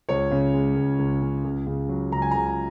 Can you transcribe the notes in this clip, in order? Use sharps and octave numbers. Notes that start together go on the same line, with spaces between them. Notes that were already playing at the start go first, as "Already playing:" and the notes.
C#2 C#5
C#3
G#3
C#2
C#2
C#3
C#2
C#3
F#3
C#2 A#5
G#5
C#2 A#5